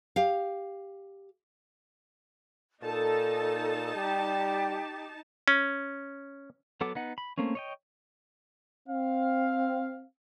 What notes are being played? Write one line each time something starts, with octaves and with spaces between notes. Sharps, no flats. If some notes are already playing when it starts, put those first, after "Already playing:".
G4 F5
A#2 D#4 A4 A5
G3 G4
C#4
F#3 B3 A4 F#5 D6
B3 D#4 F#5
B5
A3 A#3 C4 C#4
C#5 D#5 G5
C4 F5